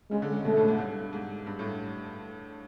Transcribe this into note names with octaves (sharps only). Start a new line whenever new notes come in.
C#3 G#3
D3
C#3
B2 A3
A2
G#2
G2
G#2
G2
A2